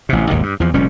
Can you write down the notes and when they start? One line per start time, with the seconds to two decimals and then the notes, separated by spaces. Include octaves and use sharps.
0.09 A1 C3
0.30 G#1 D#2 B2 D#3
0.43 G2
0.60 E2 F3
0.73 F1 A#2 G3 C#4